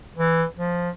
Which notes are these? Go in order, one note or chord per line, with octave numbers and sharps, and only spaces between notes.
E3
F3